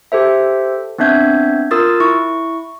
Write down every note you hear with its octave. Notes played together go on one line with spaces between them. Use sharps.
G4 A4 C5 E5
B3 C4 D4 E5 G6 G#6
F4 A#4 D#6 E6 A6
E4 C#6